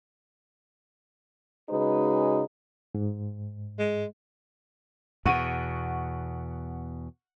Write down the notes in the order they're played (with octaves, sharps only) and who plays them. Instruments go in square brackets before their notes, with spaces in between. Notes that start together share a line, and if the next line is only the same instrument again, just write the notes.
[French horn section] C#3 G#3 D#4 F#4 G#4 B4
[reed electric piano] G#2
[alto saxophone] G#3
[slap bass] E2 B2 [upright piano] F#5 C#6 D#7